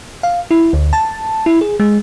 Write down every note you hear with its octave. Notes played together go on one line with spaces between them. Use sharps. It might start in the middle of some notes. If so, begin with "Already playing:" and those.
F5
E4
D2
A5
E4
G#4
G#3